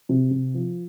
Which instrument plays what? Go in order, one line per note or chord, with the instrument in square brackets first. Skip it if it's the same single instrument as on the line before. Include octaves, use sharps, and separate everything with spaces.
[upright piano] C3
C3
F3